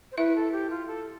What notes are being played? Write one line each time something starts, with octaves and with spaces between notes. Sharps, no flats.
C5
E4 B4 E5
A4
G4
F4
A4